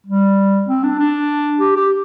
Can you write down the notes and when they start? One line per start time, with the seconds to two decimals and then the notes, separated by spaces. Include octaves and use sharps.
0.07 G3
0.68 C4
0.84 D4
0.99 D4
1.60 G4
1.76 G4